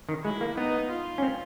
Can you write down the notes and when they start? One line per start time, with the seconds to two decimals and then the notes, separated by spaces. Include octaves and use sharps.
0.09 D#3
0.24 G#3 E4
0.41 A#3
0.58 B3 D#4
0.90 F4
1.18 C#4
1.22 C4